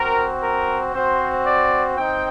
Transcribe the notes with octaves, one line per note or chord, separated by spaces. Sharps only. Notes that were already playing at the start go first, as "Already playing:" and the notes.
Already playing: C4 F#4 A#4
A#4
C4 F#4 C5
D5
C4 D#4 G5